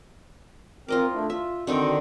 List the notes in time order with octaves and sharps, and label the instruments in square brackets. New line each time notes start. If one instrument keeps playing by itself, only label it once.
[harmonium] A#3 C4 A#4 [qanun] F4 D#5 D6
[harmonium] A3 D4 E4
[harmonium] F4 [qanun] E5
[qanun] D3 D#3 C4 [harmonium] F#4 D#5